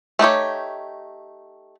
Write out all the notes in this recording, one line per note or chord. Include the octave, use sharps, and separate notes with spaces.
A3 D#4 G4 C#5